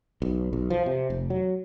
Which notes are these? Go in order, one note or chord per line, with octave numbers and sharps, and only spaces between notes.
B1
B1
F3
C3
F1
F#3